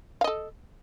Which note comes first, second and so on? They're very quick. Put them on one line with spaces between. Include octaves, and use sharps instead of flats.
F5 D#5 A4